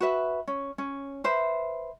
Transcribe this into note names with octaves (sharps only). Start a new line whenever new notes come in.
F#4 B4 E5
C#4
C#4
B4 C5 E5